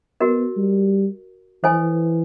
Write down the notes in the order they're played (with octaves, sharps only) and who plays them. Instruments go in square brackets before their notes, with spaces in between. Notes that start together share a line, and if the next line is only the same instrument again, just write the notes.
[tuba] B3 [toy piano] F#4 A#4 D#5
[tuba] G3
[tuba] E3 [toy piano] A4 C5 D#5 G#5